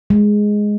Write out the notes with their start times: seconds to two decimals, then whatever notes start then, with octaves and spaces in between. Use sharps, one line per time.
0.10 G#3